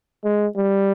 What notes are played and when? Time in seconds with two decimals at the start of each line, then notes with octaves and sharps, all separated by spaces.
0.24 G#3
0.56 G3